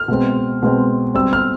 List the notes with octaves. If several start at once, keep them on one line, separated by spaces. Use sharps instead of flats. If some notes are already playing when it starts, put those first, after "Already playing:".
Already playing: F6
B2 G#3 C4
B2 G#3 C4
B2 G3 C4 E6
F6